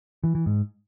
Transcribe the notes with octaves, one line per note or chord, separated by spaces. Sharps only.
E3
E3
G#2